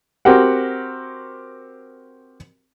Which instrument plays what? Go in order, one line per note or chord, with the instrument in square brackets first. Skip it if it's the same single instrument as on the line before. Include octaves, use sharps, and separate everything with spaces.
[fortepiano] C4 F#4 G4 A#4 F#5